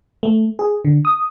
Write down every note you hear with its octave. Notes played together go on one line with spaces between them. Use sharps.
A3
G#4
D3
D#6